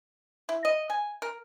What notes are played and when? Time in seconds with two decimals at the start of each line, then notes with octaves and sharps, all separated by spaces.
0.49 E4
0.65 D#5
0.90 G#5
1.22 A#4